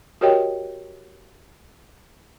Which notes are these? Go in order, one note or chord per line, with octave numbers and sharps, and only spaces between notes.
F#4 G4 A#4 C#5 D#5 G5